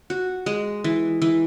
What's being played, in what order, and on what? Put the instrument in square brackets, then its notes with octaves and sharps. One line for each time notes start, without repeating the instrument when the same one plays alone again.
[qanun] F#4
G#3
E3
E3